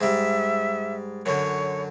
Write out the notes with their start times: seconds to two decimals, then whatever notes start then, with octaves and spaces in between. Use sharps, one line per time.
0.01 G#2 G3 E5
1.26 F#2 D3 C#5